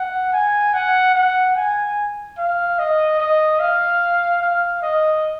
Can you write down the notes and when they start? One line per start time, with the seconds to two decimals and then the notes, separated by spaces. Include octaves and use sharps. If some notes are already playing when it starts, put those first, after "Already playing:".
Already playing: F#5
0.33 G#5
0.74 F#5
1.15 F#5
1.56 G#5
2.38 F5
2.79 D#5
3.20 D#5
3.60 F5
4.42 F5
4.83 D#5